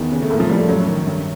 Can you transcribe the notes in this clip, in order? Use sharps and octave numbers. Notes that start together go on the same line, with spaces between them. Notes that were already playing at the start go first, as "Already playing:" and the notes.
Already playing: E2 D#3 B3
C#3
A3
A2 A#3
F3
A2 G3
A3
F#2 F#3
D#3
G2